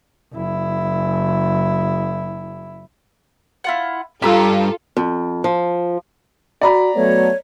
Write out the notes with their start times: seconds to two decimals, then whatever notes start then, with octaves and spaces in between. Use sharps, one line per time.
0.33 F#1 E4
3.64 E4 F4 F#5
4.22 C2 G2 F4 G4 A4 A#5 E6
4.97 F2
5.44 F3
6.61 F#4 D5 A#5 B5
6.95 F#3 A3 B3 C#5